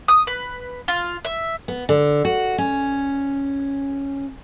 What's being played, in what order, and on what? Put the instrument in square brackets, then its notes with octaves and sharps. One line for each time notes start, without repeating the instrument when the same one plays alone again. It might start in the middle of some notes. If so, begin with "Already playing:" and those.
[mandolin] D#6
B4
F4
E5
[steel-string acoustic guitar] B3
D3
F#4
C#4